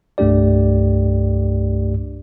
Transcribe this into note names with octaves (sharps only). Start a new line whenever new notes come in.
C2 G2 A3 D4 G4 D5